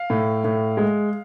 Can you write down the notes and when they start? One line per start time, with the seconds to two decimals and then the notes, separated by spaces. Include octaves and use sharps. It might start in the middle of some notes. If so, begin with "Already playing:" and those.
Already playing: F5
0.10 A2
0.44 A2
0.77 G#3